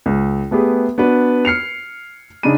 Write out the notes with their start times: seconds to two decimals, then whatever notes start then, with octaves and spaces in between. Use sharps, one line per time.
0.06 C#2
0.51 A3 B3 G4 G#4 B4
0.98 B3 D4 F#4 B4
1.45 F6 C7 C#7 F7
2.43 C#3 D4 D#4 B5 D#7